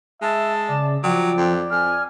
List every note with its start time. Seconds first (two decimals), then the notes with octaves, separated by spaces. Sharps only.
0.22 G#3 E5 A5
0.69 C#3 D5
1.03 F3 F#3 D5 G5
1.37 F2
1.71 F2 G#5 F6